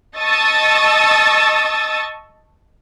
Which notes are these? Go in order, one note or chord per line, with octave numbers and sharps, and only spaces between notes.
D#5 A5 C#6 D#6 E6 A6